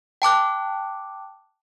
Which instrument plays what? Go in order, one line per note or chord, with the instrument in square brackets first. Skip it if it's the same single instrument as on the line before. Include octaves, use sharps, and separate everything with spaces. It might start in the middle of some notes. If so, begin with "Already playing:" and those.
[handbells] G5 A5 D6 F#6